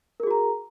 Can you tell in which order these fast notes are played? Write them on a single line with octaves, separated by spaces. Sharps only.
A#4 G#4 F#4 A#5